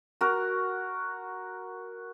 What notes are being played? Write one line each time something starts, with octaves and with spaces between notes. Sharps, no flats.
F#4 A#4